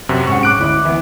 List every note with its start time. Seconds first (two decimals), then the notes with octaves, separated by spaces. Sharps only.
0.09 F#2 C3 F#4
0.27 G#2 C#4 F#5 C#6
0.43 D6 F#6 D7
0.59 D2 E4 D#5
0.85 E3 B3 E5